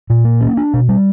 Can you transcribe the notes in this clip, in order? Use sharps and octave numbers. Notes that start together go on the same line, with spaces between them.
A#2
A#3
C#4
D4
B2
G3